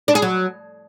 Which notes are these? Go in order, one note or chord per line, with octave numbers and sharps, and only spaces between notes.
D4
G#4
F#3